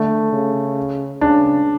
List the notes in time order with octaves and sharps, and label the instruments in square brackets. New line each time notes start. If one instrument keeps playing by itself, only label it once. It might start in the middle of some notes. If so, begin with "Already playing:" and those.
Already playing: [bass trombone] D3 [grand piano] A3
[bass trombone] C#3
[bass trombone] C#3 [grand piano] D4